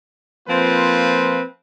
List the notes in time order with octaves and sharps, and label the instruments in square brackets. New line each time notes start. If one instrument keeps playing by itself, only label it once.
[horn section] F3 A#3 C4 F4 B4